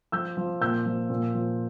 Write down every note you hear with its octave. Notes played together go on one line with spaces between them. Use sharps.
F3 E6 G6
F3
A#2 E6 G6
F3
A#2
F3